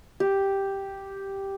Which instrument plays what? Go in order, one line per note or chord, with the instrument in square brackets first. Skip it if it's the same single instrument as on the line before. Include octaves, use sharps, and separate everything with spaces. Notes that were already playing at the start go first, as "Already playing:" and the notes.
[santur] G4